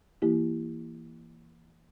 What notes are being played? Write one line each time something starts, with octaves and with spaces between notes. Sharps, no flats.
E3 A#3 E4 G4